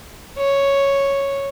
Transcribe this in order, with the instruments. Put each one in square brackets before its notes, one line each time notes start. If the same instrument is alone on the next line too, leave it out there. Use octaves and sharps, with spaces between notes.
[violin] C#5